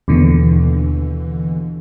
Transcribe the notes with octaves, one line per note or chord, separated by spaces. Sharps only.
D#2 B2 D3 E3